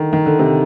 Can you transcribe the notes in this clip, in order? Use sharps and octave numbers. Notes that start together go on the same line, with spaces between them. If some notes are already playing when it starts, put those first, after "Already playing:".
Already playing: D3 D#3
D#3
D3
C3